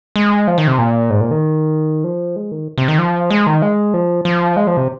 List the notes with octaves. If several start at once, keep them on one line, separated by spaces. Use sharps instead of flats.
G#3
F3
D#3
C3
A#2
G#2
A#2
D#3
F3
G#3
D#3
C3
D#3
F3
G#3
D#3
G#3
F3
F3
G#3
F3
C3